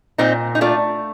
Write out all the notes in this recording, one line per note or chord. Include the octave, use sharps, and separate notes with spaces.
A#2 C4 D#4
D#4
A3 D4 F4